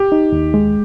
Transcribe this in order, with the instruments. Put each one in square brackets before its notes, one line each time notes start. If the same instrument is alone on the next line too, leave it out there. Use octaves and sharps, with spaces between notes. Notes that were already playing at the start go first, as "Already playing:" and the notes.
Already playing: [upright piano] G4
[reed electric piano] D#4
D#2
G#3